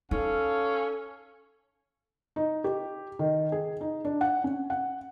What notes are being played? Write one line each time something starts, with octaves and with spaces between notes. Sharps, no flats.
C#4 D#4 A4 F5
D#4
G4
D#3
G#4
D#4
D4
F#5
C#4
F#5